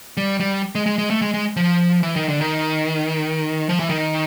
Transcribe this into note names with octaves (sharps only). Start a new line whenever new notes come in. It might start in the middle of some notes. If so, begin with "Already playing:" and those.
G3
G3
G#3
G#3
G#3
A3
G#3
G#3
F3
E3
D#3
D3
D#3
F3
E3
D#3